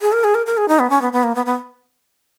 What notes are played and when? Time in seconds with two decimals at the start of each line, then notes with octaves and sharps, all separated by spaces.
0.02 G#4
0.12 A#4
0.24 G#4
0.35 A#4
0.46 A#4
0.57 G#4
0.68 D#4
0.79 B3
0.90 C#4
1.01 B3
1.13 B3
1.23 A#3
1.35 B3
1.46 B3